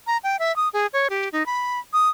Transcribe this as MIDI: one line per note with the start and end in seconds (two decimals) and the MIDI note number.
0.07 0.17 82
0.24 0.37 79
0.39 0.55 76
0.56 0.69 87
0.73 0.87 68
0.93 1.08 73
1.10 1.29 67
1.33 1.46 63
1.46 1.79 83
1.93 2.10 87